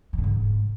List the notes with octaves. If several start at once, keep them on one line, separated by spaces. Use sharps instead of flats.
G2
D3
G#2